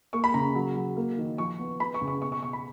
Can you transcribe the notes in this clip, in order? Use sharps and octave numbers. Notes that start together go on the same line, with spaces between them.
A#3 C#6
B5
C#3 A#5
F#3
F#3
A#3
D#3
F3 C#6
B3
B3 B5
C#6
C#3
C#6
B2 C#6
C#6
B2 C#6
B5